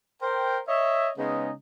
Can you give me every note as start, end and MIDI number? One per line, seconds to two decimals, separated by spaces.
0.22 0.59 70
0.22 0.59 72
0.22 0.59 79
0.68 1.10 73
0.68 1.10 75
0.68 1.10 76
1.18 1.51 49
1.18 1.51 56
1.18 1.51 59
1.18 1.51 61
1.18 1.51 63
1.18 1.51 68